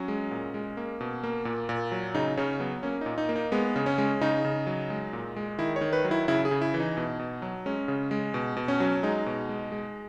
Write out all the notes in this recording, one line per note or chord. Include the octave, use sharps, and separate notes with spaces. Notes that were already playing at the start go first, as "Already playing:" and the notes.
Already playing: F#3 C#4
G#3
A#2
G#3
A#3
B2
A#3
A#2
A#2
F#3
C#3 D#4
C#3 C#4
F#3 B3
A#3 C#4
A#2 D#4
D#4
A#3
D#4
G#3 B3
C#3
C#4
G#3
C#3 D#4
C#3
F#3
G#3
A#2
G#3
D#3 E4
C#5
D#3
B4
F#3
E4
C#3 E4
G#4
C#3
E4
E3
D#4
B2
B2
F#3
G#3 C#4
C#3
G#3
B2
B2
C#4
F#3
G#3 D#4
B2
G#3
G#3